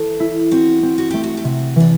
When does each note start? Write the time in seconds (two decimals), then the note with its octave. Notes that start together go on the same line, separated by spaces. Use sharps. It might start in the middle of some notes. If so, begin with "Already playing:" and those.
Already playing: E3 A4
0.20 E4
0.51 C4 F#4
0.83 C4
0.98 F#4
1.11 A3 G4
1.24 F#4
1.37 G4
1.44 C3 F#4
1.76 E3 D4